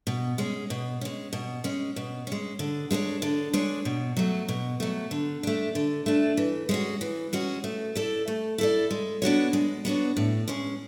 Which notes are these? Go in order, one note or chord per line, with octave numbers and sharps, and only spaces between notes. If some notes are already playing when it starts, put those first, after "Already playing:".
B2
G#3 C#4
B2
G#3 C#4
B2
G#3 C#4
B2
G#3 C#4
D3
G#3 D4 G#4 C#5
D3
G#3 D4 G#4 C#5
B2
F#3 A3
B2
F#3 A3
D3
A3 D4
D3
A3 D4
E3
G#3 C#4 F#4
E3
G#3 C#4 F#4
A3
E4 A4 D5
A3
E4 A4 D5
G#3
B3 D4 F#4 C#5
G#3
B3 D4 F#4 C#5
A2
G#3 C#4 G#4